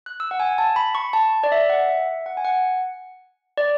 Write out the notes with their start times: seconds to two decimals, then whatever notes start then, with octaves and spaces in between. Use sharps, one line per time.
0.06 F#6
0.20 E6
0.31 F#5
0.40 G#5
0.58 A5
0.76 B5
0.95 C#6
1.13 A5
1.44 D5
1.52 E5
1.70 F#5
1.89 E5
2.26 F#5
2.37 G#5
2.45 F#5
3.58 D5